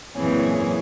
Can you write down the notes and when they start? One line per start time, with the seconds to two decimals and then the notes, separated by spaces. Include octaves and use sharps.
0.14 F#2 A#2 E3 C4 G#4 C#5